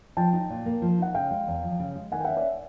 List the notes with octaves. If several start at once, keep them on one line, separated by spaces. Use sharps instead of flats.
F3 G5 A5
D#4
A#2
A#3
F3
D#4 F#5
C#3 F5 G5
G#3
E2
F3
C#3
G#3
D#3 F#5 G#5
G5
E5 F#5
C#4
D5 E5